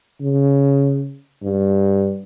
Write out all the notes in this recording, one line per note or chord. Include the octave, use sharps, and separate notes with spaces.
C#3
G2